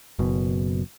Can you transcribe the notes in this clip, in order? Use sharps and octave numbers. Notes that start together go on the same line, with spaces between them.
F#1 B2